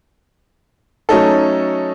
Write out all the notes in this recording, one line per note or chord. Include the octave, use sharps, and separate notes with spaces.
F#3 A3 C#4 D#4 A4